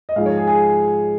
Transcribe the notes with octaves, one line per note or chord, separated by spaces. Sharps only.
D#5
G#2 F3 G#3 F5
C#5
G#4
G#4